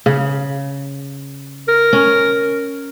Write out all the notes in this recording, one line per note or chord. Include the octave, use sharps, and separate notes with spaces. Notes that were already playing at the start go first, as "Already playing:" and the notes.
C#3
A#4
C#4